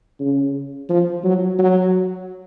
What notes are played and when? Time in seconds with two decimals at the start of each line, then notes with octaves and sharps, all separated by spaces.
0.20 C#3
0.89 F3
1.24 F#3
1.59 F#3